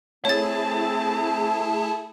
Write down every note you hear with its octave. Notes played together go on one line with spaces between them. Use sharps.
A3 C4 E4 G#4 C#5 A5 A6